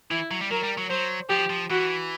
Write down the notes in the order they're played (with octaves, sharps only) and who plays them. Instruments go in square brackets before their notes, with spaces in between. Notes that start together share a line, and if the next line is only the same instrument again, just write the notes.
[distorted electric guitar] E3 [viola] E4
[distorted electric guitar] F#3
G3
[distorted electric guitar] F#3 [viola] A#4
[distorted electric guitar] G3
F#3
[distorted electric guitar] F#3 [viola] C5
[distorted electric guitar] F3 [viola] G4
[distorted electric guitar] F3
[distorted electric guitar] E3 [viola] F#4